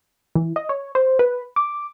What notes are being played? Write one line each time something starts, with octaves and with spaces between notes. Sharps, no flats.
E3
D#5
C#5
C5
B4
D6